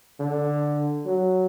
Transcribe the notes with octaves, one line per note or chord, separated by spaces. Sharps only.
D3
F#3